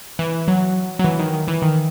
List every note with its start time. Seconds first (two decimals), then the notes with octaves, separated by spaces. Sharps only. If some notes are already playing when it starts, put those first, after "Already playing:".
0.19 E3
0.48 F#3
0.99 F#3
1.04 E3
1.19 D#3
1.33 D#3
1.48 E3
1.62 D#3